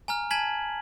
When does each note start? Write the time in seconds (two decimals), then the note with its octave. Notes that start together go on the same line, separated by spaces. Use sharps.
0.08 G#5 A#5 F6
0.31 G#5 A5 G#6 B6 F#7